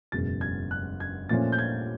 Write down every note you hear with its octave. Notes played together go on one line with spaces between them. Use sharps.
F#1 E2 B2 G#3 A6
G#6
F#6
G#6
A#2 F3 A3 C#4 A6
G6
G#6